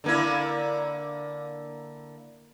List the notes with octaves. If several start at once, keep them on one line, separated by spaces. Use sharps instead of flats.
D3 A#3 E4